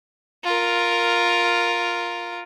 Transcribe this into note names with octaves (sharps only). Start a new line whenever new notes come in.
F4 A#4